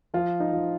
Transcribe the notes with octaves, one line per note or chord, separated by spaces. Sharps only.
F3 F4
D#4
F3